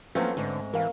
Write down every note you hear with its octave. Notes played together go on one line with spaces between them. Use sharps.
F3 F#3 A3 A#3 C4 C#4 B4
G#2 D3
E3 A#4 F5